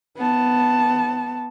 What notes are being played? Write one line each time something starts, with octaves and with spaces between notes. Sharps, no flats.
B3 A5